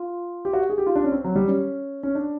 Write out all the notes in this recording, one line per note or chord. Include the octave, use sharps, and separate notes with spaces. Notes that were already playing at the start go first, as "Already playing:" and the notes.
Already playing: F4
G4
F#4
G#4
G4
F4
D4
C#4
C4
F#3
G3
C#4
C#4
D4